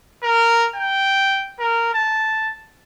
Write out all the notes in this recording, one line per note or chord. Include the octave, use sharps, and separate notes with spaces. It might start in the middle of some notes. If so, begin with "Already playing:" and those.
A#4
G5
A#4
A5